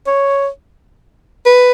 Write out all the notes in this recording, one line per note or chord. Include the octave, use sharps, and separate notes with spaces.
C#5
B4